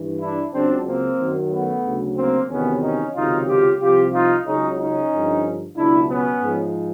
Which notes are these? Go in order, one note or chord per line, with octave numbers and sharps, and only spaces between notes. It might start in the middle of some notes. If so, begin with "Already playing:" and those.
Already playing: G2 E3
D4 E4
C#2 C#3 F#3 C4 D4
A#3 C4
F#2 D#3 F#3
A3 B3
D2 C#3 F#3
A#3 C4
E2 C3 D#3 F#3 B3 C#4
C#4 D#4
C#2 C3 D#3 F#3 D#4 F4
F4 G4
C2 C3 F3 F4 G4
D#4 F4
C#2 C#3 F#3 C#4 D#4
C#4 D#4
G2 D3 F3
C#2 B2 F#3 D4 E4
B3 C#4
G#2 F3